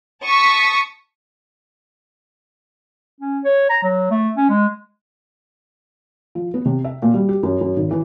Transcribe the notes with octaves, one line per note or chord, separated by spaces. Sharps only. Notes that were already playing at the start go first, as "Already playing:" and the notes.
A5 C#6 D#6 B6
C#4
C#5
A#5
F#3
A3
C#4
G#3
F3
B3
C3
E5
A#2
G3
G4
F#2
F#2
G#1
E3